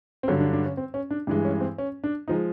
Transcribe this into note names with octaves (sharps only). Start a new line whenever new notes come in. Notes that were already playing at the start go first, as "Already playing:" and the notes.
C4
G2 D3 F#3 C#4
D4
D4
C#4
C4
C#4
D4
G2 E3 G#3 D4
C#4
C4
C#4
D4
F3 G#3 D#4